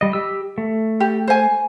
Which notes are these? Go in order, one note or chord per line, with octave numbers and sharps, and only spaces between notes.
G3 D#5
G4 E6
A3
G4
C5 G#5